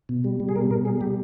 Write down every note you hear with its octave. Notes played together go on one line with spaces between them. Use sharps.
B2
G3
G3
G#4
B2 A#4
B2 A#4
G3 G#4
G3 G4